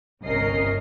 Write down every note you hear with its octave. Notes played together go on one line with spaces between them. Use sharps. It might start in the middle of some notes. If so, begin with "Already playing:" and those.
G1 C2 C#4 A#4 D#5 C7